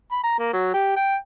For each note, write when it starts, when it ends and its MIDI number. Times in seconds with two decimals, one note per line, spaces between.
0.12 0.20 83
0.23 0.36 82
0.39 0.51 58
0.53 0.73 54
0.74 0.94 67
0.96 1.16 79